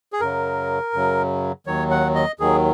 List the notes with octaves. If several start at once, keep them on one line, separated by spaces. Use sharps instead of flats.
G#4
F#2 C#3 F#3 A#4
F#2 C#3 F#3
D#2 D#3 F#3 C#5
F#5
D#5
D#2 D#3 F#3 G#4